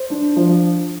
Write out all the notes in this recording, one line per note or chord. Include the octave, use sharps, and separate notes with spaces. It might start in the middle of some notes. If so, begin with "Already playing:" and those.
Already playing: C5
D4
F3